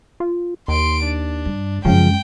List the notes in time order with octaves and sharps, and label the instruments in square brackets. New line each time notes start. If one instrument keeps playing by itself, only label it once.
[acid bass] F4
[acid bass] D#2 [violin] C6 D7
[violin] D4
[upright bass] G2
[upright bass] F#2 G#3 [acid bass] C#3 [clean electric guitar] F3 [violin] G5